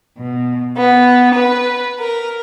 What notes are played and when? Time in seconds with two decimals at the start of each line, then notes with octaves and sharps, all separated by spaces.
0.18 B2
0.77 B3
1.34 B4
1.99 A#4